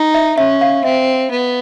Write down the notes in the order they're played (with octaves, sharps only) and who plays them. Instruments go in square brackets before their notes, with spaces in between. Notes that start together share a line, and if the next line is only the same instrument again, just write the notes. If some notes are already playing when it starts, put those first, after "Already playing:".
Already playing: [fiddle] D#4
[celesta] E5
[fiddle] C#4 [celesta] E5
[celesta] F5
[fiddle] C4 [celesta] E5
[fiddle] B3